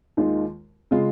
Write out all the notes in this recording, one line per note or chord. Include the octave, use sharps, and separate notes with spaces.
D#2 D#3 G#3 F4
C#3 G#3 F4